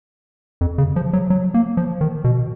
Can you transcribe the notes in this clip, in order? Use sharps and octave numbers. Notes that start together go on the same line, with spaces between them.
F2
C#3
F3
F#3
F#3
A#3
F3
D#3
B2